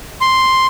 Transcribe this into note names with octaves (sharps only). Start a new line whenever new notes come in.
C6